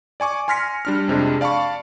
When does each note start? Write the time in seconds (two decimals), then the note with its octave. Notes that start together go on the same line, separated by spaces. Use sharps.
0.20 D5 G#5 C#6 D6
0.48 G#5 C6 F6 A#6 B6 C#7
0.85 G3 D4 F6
1.08 F2 C3 G#3 D4
1.41 D5 F5 A5 B5 C#6